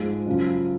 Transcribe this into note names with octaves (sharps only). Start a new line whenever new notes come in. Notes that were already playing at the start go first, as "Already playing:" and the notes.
Already playing: G#2 F3 G#3
F#2 C#3 F3